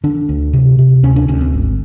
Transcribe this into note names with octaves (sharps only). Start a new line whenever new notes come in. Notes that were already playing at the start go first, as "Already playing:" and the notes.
D3 D4
D2
C3
C3
D2 C#4
D4
D2 C#4
C4
G#1